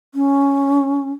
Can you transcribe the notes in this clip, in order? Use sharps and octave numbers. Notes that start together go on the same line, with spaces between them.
C#4